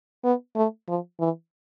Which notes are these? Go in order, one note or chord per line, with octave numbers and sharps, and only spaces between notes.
B3
A3
F3
E3